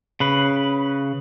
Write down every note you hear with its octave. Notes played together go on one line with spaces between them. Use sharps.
C#3 B4